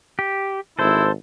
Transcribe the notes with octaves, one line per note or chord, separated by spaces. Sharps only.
G4
G#1 E4 A4 C5